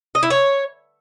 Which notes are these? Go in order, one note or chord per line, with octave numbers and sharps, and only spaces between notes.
D#5
E4
C#5